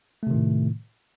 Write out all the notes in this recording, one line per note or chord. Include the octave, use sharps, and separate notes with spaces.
A2 C3 D#3 A3